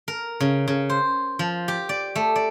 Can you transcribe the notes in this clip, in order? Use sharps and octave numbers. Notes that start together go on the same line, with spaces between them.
A#4
C#3
C#3
C5
F3
G4
D5
A3
D5